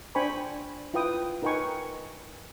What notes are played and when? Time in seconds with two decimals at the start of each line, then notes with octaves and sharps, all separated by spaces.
0.15 D4 C5 G5 G#5 B5 C#6
0.94 E4 F4 B4 G5 D#6
1.42 D#4 A#4 B4 G5 G#5 C#6